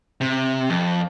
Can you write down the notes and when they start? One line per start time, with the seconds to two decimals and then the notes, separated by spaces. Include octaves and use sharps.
0.21 C3
0.70 F2